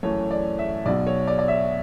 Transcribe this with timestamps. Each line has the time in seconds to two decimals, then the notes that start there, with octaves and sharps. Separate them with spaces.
0.03 F#2 E3 A3 C#5
0.31 D5
0.59 E5
0.85 B1 B2 F#3 D5
1.07 C#5
1.27 D5
1.39 D5
1.48 E5